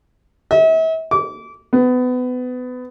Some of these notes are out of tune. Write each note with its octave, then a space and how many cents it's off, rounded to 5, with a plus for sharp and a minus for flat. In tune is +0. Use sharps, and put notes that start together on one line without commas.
E5 -40
D6 -25
B3 +25